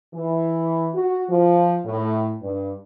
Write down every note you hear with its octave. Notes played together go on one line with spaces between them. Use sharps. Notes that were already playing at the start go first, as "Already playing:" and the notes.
E3
F#4
F3
A2
G2